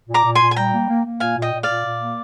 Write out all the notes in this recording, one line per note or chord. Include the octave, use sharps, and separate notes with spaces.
A#2
A#5 D6
A#2
G#5 C6
A#2
G#5
G3 G5 A#5
A#3
A#3
A#3
A#2 F5 G#5
A#2
D#5 G5
A#2
D5 F5
A#2
A#2
A#3